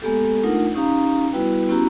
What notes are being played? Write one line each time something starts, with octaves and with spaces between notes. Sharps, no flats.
G#3 A#3 B3 G4 A4
A3 D4 D#4 F4 A#4 F#5
C#4 D#4 G4 F5 A#5
G3 B3 E4 F#4 B4 G5
B3 C#4 E4 F#4 G4 A#5